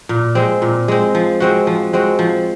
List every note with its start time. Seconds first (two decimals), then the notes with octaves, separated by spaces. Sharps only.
0.09 A#2
0.35 G#3 C4
0.62 A#2
0.88 G#3 C4
1.15 F3
1.40 G#3 C4 F#4
1.67 F3
1.93 G#3 C4 F#4
2.19 F3